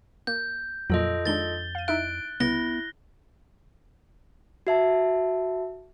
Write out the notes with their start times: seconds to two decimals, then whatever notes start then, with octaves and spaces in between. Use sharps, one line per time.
0.27 A#3 G6
0.90 F2 A#2 F3 F#3 F4 A4 D#5
1.25 D#3 G#3 D4 A6 G7
1.75 F5 D#7
1.88 D#4 E4 E5 F#6 D7
2.40 C2 C#3 B3 E4 A#6 G7
4.67 F#4 E5 A5